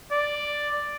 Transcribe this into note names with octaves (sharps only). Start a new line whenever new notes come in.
D5